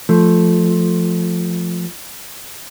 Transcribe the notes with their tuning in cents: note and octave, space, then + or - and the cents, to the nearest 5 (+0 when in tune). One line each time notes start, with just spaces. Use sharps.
F3 +0 A3 +0